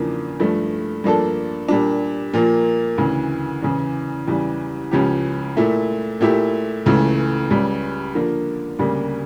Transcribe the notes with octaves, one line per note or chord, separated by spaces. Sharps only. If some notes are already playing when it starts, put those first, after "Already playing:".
Already playing: E2 C#3 F3 A#3 D4
G2 F3 A3
G2 F3 A#3 D4 A4
A#2 G3 D4
A#2 F3 A#3
D2 C#3 E3
E2 C#3 E3
E2 C#3 E3 G3
C#2 C#3 F3 C#4 G4
A#2 A3 E4
A#2 A3 E4 G4
C#2 C#3 E3 A3
C#2 C#3 G3
D3 F3 A#3
D2 C#3 G3 A#3